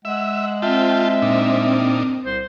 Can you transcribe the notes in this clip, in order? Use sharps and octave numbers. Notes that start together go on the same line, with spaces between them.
G#3 E5 F#5
C4 F4 E5 G5 A5
A#2 D4 D#4
C2 C5